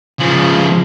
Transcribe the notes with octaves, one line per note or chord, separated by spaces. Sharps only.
C#3 F3